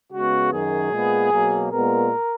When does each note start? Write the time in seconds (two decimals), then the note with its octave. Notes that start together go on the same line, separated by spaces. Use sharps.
0.11 C#3 G#3 B3 F#4
0.51 F#2 D#3 F#3 G#4
0.91 A#2 G#3 B3
1.31 B2 F#3 A#3
1.71 A#2 G#3 B3 A#4